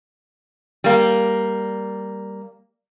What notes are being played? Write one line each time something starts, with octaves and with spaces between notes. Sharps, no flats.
G3 A#3